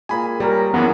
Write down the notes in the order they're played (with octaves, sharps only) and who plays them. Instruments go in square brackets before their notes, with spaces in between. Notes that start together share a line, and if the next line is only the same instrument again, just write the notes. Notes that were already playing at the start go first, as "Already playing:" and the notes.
[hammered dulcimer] A#2 G#4 [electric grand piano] G#5 B5
[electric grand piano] G3 [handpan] G#4 A#4 [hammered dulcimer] C#5 A#5
[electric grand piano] F#2 E3 [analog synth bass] B3